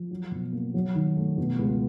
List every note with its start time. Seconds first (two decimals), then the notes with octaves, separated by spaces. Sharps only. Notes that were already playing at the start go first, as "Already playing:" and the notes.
Already playing: F3
0.11 F#3
0.32 B2
0.53 A#3
0.74 F#3
0.95 D#3
1.17 A3
1.38 B2
1.59 C#2